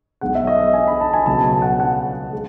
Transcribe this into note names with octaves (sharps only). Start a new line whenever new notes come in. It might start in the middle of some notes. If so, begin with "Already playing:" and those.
B1 B2 G#3 F#5
E5
D#5
E5
G#5
B5
A5
G#5
C#2 B2 F#3 B3 A5
A5
F#5
F#5
G#3